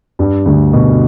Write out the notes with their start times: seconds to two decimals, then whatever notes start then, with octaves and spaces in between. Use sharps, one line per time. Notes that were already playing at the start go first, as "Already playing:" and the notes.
0.19 G2 G3
0.46 D2 D3
0.73 B2